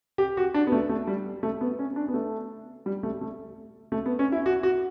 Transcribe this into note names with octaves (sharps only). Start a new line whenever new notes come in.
G4
F#4
D4
B3
A3
A3
G3
A3
B3
C#4
D4
B3
A3
G3
A3
A3
A3
B3
C#4
E4
F#4
F#4